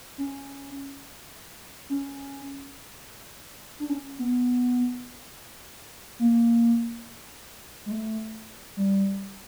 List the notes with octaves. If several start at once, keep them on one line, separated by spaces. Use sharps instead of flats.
C#4
C#4
D4
C#4
B3
A#3
G#3
A3
G3